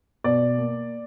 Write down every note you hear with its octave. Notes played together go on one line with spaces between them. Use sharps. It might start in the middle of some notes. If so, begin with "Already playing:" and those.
B2 D5
A#3